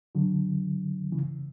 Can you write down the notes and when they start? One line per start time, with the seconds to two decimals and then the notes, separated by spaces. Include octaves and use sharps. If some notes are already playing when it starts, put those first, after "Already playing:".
0.15 D3 F#3
1.12 C#3 E3